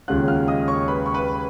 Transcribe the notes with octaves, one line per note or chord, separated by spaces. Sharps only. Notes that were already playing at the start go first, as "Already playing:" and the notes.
D#2 C#3 G#3 C#4 F4 F#5 F#6
F5 F6
D#5 D#6
C#5 C#6
B4 B5
C#6
B4 B5